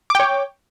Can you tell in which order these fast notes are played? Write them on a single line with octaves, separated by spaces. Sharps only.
D6 G5 C#5